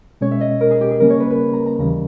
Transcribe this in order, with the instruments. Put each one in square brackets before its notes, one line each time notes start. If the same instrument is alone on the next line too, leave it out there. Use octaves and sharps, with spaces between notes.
[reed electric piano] B2 G#3 C#4 [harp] C#5
[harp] E5
D#5
A#4
G#4
G4
G#4
[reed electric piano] C#3 G3 A#3 C#4 [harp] A#4
[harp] C#5
B4
B4
A#5
A#5
[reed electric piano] D#2 C#3 E3 G3 [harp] A#5